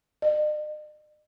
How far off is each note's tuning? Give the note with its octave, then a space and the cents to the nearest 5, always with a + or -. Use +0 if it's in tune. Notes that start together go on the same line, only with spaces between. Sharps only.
D#5 -45